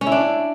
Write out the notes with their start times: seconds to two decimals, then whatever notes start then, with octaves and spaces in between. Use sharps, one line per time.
0.01 C#4
0.06 E4
0.12 D4